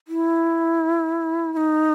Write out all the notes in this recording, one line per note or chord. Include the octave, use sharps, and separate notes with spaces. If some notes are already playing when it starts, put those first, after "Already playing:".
E4
E4
D#4